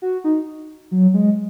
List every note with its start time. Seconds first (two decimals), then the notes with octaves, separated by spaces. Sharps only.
0.02 F#4
0.24 D#4
0.91 F#3
1.14 G#3